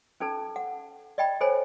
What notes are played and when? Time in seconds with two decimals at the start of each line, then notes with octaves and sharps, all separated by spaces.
0.20 C#4 D#4 A4 A5
0.56 F#5
1.18 D5 D#5 G5 B5
1.41 A4 C5 C#5 G#5 B5